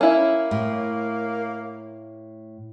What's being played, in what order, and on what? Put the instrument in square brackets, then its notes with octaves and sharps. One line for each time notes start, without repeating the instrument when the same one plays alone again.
[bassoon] A#3 [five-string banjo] C#4 E4
[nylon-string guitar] A2